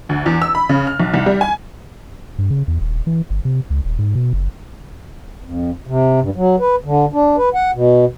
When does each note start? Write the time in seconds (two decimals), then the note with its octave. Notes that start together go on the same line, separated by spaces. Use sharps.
0.09 D2
0.26 E2
0.42 E6
0.55 B5
0.69 C#3
0.87 F6
1.00 B1
1.14 C2
1.26 G3
1.41 G#5
2.38 G2
2.51 C#3
2.68 E2
2.81 D#1
3.07 E3
3.30 G1
3.45 C3
3.70 C#2
3.85 D#1
3.99 G#2
4.15 B2
4.33 F#1
5.44 F2
5.87 C3
6.21 G2
6.36 F#3
6.59 B4
6.84 D3
7.13 D4
7.37 B4
7.54 F#5
7.75 B2